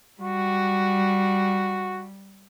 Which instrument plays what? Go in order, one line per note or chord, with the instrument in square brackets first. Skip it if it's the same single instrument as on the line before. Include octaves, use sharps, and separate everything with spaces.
[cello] G3 [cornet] F#4